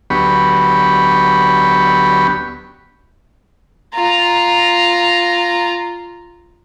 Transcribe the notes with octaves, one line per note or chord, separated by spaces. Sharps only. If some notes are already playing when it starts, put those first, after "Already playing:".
D2 F#3 B3 G4 B5 C#6
F4 A#5